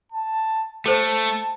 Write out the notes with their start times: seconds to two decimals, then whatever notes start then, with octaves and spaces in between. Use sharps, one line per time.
0.12 A5
0.86 A3 A4 C5 C#5 A5